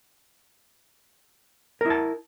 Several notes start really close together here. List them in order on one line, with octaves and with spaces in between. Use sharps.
A#4 E4 A5